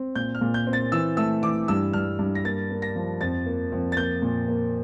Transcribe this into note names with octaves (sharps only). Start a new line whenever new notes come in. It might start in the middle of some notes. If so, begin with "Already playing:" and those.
Already playing: C4
A#2 G6
F6
A#2
G6
C4
A6
E3 E6
A3 E6
E3 D6
G2 E6
G2 F6
G2
A#6
A#3 A6
A#3
A#6
F3
F2 A6
A#3
F2
A6
A#3 G6
A#2
A#3